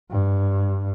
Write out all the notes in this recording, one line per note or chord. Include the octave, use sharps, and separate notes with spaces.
G2